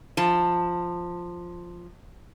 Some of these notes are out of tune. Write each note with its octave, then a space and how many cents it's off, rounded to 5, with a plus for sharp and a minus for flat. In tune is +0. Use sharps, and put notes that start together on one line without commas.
F3 +0 A5 +15